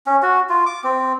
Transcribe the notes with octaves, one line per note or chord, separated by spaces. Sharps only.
C#4
F#4
F4
D6
C4